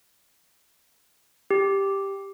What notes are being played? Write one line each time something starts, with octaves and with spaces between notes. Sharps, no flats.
G4